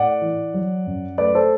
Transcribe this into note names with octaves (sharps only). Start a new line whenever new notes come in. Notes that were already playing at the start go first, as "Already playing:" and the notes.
Already playing: A2 D5 F#5
E3
F#3
F#2
A3 B4 D5
A4 C5